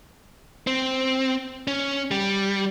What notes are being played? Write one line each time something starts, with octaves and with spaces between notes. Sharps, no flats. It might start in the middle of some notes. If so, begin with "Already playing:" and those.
C4
C#4
G3